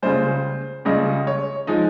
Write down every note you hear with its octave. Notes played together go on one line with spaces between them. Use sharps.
C#2 C#3 G3 C5
C#2 C#3 G3 D#5
C#5
F3 G#3 D#4